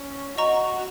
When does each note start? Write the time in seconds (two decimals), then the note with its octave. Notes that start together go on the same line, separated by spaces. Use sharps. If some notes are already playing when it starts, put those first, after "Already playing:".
Already playing: C#4
0.38 F#4 D#5 A#5 C#6